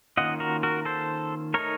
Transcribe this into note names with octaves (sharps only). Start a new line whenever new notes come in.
D#3 A#3 C#4 F4 D#5 F#5
F#4 A#4
F#4 A#4
A4 C5
A3 D#4 A#4 C#5